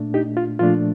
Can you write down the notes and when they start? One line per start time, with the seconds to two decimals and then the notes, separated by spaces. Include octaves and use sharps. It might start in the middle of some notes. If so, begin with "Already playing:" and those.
Already playing: A#2 A3 D4
0.14 D#4 G4
0.37 F4
0.59 A#2 F3 A3 D4 F4